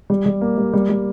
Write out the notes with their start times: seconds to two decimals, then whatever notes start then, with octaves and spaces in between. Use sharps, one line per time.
0.10 G3
0.26 G3
0.41 A#3
0.58 G3
0.73 G3
0.89 G3